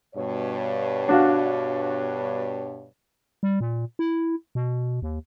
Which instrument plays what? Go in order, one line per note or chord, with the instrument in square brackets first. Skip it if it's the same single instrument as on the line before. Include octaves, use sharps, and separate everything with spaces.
[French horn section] G2 B2 C#5
[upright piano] D4 F#4 F5
[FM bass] G3
A#2
E4
B2
D#2